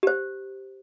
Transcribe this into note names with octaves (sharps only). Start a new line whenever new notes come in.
G4 C5